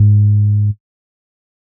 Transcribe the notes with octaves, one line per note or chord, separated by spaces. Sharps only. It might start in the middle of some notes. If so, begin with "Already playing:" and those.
Already playing: G#2